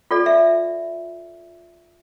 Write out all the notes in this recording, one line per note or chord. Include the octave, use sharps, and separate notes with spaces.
F4 A4 D5
E5